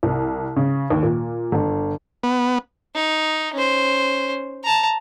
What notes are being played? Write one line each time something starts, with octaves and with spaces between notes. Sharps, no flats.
C2
C#3
D#2
A#2
G1
B3
D#4
C#4 C5
A5 A#5